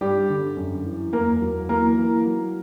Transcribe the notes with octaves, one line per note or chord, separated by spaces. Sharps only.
G2 G3 G4
D3
F#2
E3
E2 A#3 A#4
F#3
E3 A#3 A#4
E3
F#3